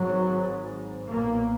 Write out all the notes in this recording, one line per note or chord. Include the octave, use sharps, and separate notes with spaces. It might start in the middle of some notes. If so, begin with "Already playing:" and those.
Already playing: G#1 G#2 F#3
B1 A#2 A#3